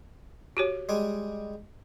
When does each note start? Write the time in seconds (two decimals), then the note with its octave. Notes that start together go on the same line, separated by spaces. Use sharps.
0.57 F#4 G4 C#5
0.89 G3 G#3 G#5